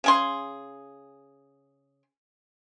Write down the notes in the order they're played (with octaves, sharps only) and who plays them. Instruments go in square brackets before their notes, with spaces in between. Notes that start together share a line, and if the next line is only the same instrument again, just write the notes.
[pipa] C#3 G#4 C6